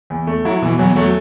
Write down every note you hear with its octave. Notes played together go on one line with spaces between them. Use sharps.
E2
A3
F#3 E4
B2 E3
E2 F#3
F#3 A3